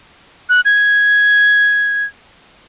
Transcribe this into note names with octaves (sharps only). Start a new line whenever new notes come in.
F#6
G#6